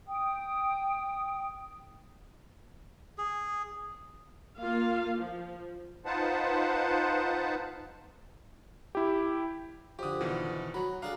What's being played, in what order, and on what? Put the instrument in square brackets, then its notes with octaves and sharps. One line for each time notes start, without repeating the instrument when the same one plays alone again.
[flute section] G5 D#6
[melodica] G#4
[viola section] A#3 F4 F5
F3
[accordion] D#4 F4 B4 C5 F#5 A5
[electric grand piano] E4 G4
[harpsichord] F2 D3 [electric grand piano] G4 D#6
[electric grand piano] B2 D#3 E3
[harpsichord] F#3 [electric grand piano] A#5 B5
[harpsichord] D4 G#4 A4 [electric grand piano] F5 A#5